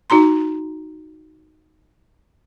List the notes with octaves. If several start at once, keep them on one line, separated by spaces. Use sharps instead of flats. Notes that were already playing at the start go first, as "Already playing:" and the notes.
D#4 F#4 A#5 C6